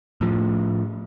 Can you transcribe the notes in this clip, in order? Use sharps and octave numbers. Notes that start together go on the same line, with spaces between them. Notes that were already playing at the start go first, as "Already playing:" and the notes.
A2 F3